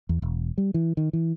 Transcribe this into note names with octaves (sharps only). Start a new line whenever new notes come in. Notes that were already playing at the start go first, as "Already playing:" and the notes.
E2
E1
G3
E3
D#3
E3